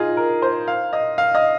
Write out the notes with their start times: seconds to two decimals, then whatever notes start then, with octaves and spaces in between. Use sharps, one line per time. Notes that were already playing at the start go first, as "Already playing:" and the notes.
Already playing: D#4 F4 G#4
0.17 A#4
0.42 C5
0.68 F5
0.93 D#5
1.18 F5
1.35 D#5